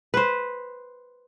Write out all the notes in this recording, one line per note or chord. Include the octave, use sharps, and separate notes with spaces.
B4 C5